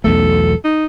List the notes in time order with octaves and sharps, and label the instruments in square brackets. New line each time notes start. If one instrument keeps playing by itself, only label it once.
[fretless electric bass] B1 E2 A3 [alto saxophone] A4
[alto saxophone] D#4